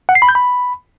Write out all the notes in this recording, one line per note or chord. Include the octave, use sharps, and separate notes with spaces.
F#5
C7
B5
G6
B5